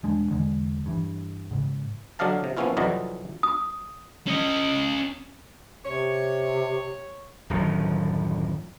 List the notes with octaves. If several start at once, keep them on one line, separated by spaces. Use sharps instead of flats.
E1 G#3 D4
E2 D3 G#3
G2 E3
G#2 C#3
D3 F#3 D4 D#5 F5 A5
C3
F3 A#3 B3 C#4 E4 F4
C2 F2 E3 F#3 D5 D#5
D#6
C#4 D#5
C3 C#5
D1 F#2 D#3 F3